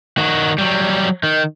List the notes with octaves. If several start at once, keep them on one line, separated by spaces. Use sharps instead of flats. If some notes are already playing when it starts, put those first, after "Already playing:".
D#3 F#4
F#3 G3
D#3